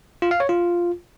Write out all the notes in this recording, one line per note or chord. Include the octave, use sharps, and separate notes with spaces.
F4
F5
C#5
F4